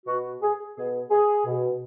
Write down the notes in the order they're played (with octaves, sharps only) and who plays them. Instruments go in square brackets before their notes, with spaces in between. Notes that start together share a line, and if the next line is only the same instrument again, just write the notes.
[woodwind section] B2 F#4
G#4
B2 G#4
G#4
B2